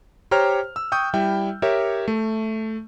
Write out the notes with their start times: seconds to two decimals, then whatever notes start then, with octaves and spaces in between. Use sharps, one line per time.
0.31 G4 C5 C#5 G5 A#5 F6
0.76 E6
0.92 G5 C#6 D#6 G6
1.14 G3 E4 E5 G5
1.62 G4 A#4 C#5 E5
2.08 A3